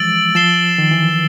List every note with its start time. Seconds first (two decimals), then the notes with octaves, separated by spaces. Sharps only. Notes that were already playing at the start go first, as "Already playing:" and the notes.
Already playing: E3 F3 G#3 E6 A6 D7 F#7
0.35 F3 A6 C7 E7 G7
0.78 D#3
0.91 E3